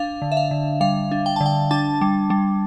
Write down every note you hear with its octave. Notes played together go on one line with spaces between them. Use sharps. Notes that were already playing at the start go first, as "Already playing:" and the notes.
Already playing: D4 F5
D3
E5
F5
D3
G3 F5
D4
G5
D3 A5
G5
D4 A5
G3
G3